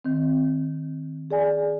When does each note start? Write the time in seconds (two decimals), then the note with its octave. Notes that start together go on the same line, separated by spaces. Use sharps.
0.05 D#3 C4
1.31 G#4 D5 G#5